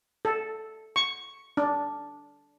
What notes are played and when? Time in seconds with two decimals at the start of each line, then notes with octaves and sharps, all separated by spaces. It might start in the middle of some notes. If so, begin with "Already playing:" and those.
0.25 A4
0.96 C#6
1.57 D4